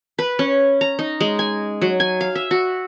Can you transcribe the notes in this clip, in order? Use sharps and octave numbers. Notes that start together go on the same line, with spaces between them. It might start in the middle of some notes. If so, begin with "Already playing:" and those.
B4
C#4
A#5
D#4
G#3
G#5
F#3
G#5
F5
E5
F#4